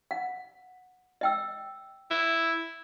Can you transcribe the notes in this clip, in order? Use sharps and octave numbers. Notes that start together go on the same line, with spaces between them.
F#5
D#5 G5 E6
E4